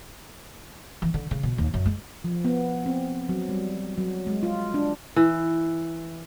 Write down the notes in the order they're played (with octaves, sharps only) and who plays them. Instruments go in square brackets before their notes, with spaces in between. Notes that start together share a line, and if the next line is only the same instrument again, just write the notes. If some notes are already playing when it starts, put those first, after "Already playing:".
[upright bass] E3
D3
C#3
B2
D#2
F#2
G#3
[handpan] F3
B3
C4
F#3
G3
F#3
G#3
F4
D4
[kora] E3